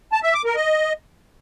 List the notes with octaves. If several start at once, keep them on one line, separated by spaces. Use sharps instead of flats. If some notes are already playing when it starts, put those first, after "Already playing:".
A5
E5
D6
A#4
D#5